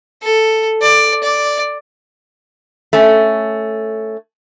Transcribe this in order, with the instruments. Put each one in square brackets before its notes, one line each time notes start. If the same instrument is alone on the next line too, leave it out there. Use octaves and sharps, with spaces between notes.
[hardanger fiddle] A4
D5
D5
[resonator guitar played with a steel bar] A3 C#4